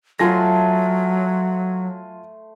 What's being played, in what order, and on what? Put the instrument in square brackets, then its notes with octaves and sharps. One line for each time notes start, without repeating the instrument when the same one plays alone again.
[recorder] F#3 [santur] A3 C5 C6 [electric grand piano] F4 G#5 A#6